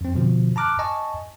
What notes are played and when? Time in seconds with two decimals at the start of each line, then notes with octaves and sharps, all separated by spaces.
0.01 F2 C4
0.15 B2 D3 F3
0.56 A5 A#5 D6 F6 F#6
0.79 D#5 G#5 A5 C#6